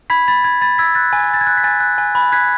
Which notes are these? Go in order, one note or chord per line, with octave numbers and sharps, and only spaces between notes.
B5 G#6 B6
B5 A6
B5 G#6
B5 A6
E6 G#6 B6
F#6 A6
G#5
G#6
G#5 A6
G#6
F#6
B6
G#5 A6
F#6
G#5
B5
F#6 G#6 B6